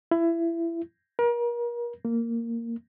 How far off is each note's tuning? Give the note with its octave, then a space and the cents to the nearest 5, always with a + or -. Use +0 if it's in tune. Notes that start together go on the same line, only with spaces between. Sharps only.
E4 +25
A#4 +35
A#3 -10